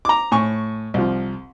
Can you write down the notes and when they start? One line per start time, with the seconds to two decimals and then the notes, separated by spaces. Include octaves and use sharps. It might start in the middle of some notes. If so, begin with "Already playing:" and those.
0.05 A#5 D6
0.32 A2 G#5 C#6
0.94 C2 F3